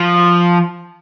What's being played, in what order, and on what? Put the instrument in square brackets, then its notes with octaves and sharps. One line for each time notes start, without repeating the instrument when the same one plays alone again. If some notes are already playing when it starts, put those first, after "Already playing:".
Already playing: [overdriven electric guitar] F3